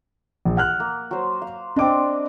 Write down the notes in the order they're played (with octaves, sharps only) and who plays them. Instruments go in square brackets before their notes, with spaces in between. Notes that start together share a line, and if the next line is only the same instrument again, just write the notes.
[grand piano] A#1
F#5 F6 F#6
[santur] A#3
F#3 C5
F5
[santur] C4 D5 D#5 [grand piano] D4 D6